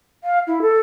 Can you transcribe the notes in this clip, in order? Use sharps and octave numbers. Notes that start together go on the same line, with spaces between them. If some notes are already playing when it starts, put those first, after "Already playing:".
F5
E4
A4